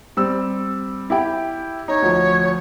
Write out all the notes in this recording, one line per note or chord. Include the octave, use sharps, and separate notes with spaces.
G3 C4 E6
E4 G4 G5
D#4 C#5
D2 F3